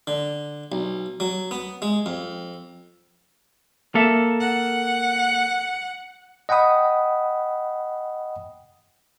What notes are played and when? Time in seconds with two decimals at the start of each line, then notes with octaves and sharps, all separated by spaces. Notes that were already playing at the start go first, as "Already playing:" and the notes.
0.07 D3
0.72 B1
1.20 F#3
1.51 B3
1.82 G#3
2.06 F2
3.95 A#3 A4 E5
4.40 F#5
6.49 D#5 F#5 G5 B5 D#6